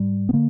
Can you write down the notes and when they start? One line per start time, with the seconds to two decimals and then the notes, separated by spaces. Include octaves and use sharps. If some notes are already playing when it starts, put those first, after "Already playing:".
Already playing: G#2 G3
0.29 B3
0.33 D3 A#3